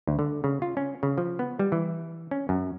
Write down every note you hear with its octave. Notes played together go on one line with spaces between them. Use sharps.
D2
D3
C#3
F4
C#4
C#3
F3
B3
G3
E3
C#4
F#2